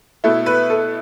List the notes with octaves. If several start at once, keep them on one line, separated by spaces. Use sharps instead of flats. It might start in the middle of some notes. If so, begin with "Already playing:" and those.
B2 A3 E4 A4
B4
A4